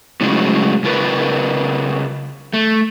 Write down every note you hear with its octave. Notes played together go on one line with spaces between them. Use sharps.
A2 C#3 F3 F#3 G#3
C#3 F4 A#4 B4
A3